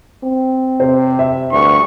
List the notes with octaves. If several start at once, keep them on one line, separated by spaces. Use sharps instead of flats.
C4
C3 C5
E5
D2 G2 C#6